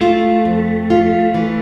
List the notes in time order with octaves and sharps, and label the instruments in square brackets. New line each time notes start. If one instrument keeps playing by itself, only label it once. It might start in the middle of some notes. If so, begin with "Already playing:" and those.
[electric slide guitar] A3 [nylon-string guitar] F4
[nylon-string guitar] F2
F4
E3